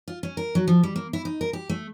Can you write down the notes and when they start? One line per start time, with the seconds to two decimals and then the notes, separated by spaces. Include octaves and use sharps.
0.08 F4
0.23 C#4
0.37 A#4
0.55 F#3
0.68 F3
0.83 G3
0.96 A#3
1.13 E4
1.25 D#4
1.41 A#4
1.53 G4
1.70 A3